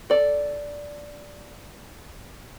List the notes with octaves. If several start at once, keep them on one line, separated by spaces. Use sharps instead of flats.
A4 D5